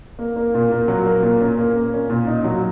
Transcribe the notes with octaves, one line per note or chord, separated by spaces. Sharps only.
A#3
A#3
A#2
A#3
F#3
A#3
A#2
C#4
A#3
A#3
C#4
A#2
D#4
F#3